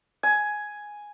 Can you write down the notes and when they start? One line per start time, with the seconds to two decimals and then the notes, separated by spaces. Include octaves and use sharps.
0.23 G#5